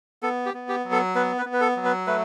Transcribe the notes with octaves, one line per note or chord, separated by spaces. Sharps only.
B3 A4
G4
B3
G4
F#3
A4
B3 B4
B4
B3
B4
A4
F#3
B4
A3 B4